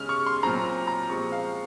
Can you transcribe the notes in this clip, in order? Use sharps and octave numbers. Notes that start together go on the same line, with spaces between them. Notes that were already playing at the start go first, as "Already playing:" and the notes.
Already playing: C#3 G#3 C#4 F6
C#6
C6
A#2 F#3 C4 A#5
A#5
F3 G#3 C4 C#6
F5